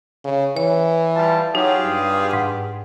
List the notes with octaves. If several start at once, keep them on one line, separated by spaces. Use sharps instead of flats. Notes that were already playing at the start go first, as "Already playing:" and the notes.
C#3
E3 C#5
G3 F4 A5
F#3 D#4 F4 G4 G#4
G2
G#2 F#5